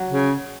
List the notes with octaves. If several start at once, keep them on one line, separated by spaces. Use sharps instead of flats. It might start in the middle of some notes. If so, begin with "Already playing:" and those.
Already playing: F#3
C#3